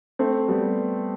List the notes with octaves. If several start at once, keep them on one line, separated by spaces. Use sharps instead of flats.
A3 C4
G3 B3